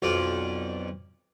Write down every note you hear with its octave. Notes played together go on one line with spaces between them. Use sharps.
B1 F2 F4 D5